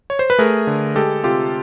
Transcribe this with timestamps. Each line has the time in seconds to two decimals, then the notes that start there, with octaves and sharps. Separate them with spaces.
0.10 C#5
0.19 C5
0.30 B4
0.38 A3 G#4 A#4
0.67 D3
0.95 G#3 G4 A4
1.23 C3 F4 G4